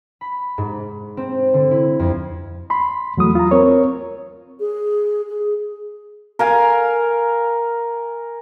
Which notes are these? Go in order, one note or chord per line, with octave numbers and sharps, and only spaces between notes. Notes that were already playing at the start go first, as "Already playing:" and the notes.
B5
G#2
C4
D3
E4
F2
B5 C6
E2 F#3 A3 D#6
F4 A#5
C4 A#4 C#5
G#4
G#4
A#4 F5 G#5